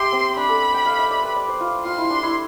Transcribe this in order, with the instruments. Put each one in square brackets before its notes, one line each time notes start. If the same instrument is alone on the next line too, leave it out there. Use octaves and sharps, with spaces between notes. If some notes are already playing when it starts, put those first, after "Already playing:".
Already playing: [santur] G4 E5 [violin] C6
[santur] C4
[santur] D4 [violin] B5
[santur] A4
G5
F5
E5
D5
B4
D5
C5
F4
[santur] F4 [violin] C6
[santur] E4
D4
E4